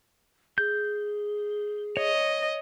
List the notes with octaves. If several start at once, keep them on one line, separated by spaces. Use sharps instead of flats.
G#4 G6
C#5 D#5